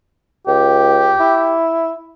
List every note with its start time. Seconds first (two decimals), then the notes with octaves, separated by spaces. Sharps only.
0.47 C#2 G4
1.20 E4